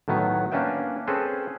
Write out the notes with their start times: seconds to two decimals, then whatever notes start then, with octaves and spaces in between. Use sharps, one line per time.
0.08 A2 D#3 F#3 B3
0.52 A#3 C#4 D4 B4 E5 G5
1.07 C4 C#4 G#4 A4 B4 C5